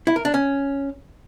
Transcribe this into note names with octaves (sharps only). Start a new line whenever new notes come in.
E4
A#4
D4
C#4